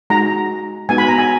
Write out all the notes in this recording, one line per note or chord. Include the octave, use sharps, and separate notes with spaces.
G#3 D#4 F#4 A#5
G#3 B3 D#4 F#4 G#5
B5
A#5
G#5